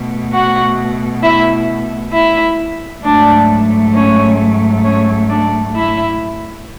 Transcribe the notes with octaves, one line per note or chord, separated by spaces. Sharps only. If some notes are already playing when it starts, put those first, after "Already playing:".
Already playing: B2 A3
F#4 F#5
E4 E5
E4 E5
G#2 F#3 A3 D4 D5
C#4 C#5
C#4 C#5
D4 D5
E4 E5